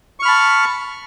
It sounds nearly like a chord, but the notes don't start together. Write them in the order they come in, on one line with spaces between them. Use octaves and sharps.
C#6 F6 B5 A5